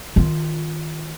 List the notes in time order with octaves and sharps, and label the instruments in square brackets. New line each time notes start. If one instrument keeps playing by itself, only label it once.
[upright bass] D#3 F4